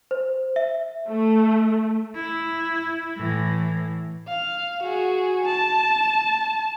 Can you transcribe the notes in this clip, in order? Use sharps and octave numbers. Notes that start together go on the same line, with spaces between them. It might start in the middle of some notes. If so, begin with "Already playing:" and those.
C5
E5
A3
E4
A2 E3
F5
F#4 G#4
A5